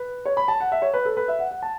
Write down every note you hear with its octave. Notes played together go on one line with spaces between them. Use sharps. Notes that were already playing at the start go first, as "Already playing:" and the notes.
Already playing: B4
C#5
B5
A5
F#5
E5
C#5
B4
A4
B4
E5
F#5
F#5
A5